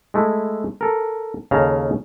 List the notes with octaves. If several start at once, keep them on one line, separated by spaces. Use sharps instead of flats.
G#3 A3 E4
A4 A#4
D#2 C#3 A4 F5 A5 A#5